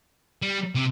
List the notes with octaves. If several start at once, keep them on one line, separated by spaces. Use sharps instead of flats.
G3
C3